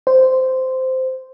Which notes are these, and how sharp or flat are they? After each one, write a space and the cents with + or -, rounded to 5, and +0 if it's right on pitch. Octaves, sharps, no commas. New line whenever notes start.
C5 -10